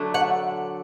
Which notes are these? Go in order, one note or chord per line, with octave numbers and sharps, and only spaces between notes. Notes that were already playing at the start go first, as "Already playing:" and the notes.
Already playing: D3 F#3 A3
F#5